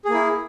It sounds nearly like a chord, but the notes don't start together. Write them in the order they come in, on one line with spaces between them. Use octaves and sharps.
G#4 A#3 E4